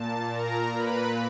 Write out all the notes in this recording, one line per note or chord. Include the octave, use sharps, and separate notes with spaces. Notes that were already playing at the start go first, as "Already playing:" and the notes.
Already playing: A#2 A5
A#4 A#5
B4 B5